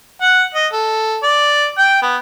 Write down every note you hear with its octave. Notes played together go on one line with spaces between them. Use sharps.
F#5
D#5
A4
D5
G5
B3